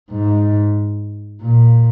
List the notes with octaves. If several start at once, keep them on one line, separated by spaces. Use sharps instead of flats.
G#2
A#2